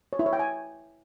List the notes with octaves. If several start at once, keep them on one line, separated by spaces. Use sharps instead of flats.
C#5
E4
C#5
G5
G#5